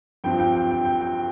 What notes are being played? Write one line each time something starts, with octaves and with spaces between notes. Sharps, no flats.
G2 F3 C4 G5
G5
G5
G5
G5
G5